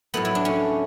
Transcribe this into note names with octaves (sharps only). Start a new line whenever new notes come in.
A2 F#3 A3 B3
E4
D4
C#4